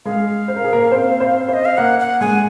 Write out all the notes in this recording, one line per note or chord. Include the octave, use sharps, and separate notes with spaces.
G#3 G#4 F5
C5
A#4
G#4
A#3 A#4
C4 C5
C4 C5
C4 C5 D#5
F5
A#3 A#4 F#5
F#5
G#3 G#4 G#5